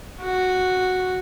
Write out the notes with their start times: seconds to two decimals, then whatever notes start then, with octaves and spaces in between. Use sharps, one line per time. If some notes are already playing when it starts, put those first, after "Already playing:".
0.20 F#4